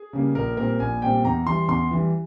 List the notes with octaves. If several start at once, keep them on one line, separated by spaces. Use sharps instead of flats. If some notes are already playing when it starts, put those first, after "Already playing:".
Already playing: G#4
C#3 G3 A#3
A#1 A#4
A#2 G3 C4 A#4
A#1 G#5
A#2 G3 C4 G5
E2 A#5
E3 G3 C6
E2 C6
E3 G3